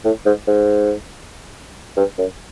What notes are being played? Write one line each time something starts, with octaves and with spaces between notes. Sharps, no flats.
A2
G#2
G#2
G2
F#2